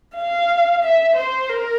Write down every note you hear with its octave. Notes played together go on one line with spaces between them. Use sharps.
F5
E5
C5
A#4